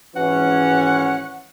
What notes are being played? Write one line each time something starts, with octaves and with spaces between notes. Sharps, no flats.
G#1 E3 C#4 F#5